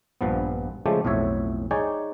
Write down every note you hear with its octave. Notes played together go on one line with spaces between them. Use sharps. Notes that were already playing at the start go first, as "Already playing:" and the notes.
A#1 G2 F3 B3
C#3 F3 G#3 A3 G4
B1 F2 A2 C#5 E5
D#4 G#4 C#5 D5 G5 G#5